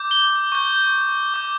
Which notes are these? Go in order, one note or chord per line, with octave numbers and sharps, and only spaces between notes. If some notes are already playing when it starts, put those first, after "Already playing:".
Already playing: D6 G6
G7
C#6 G6
D6 G6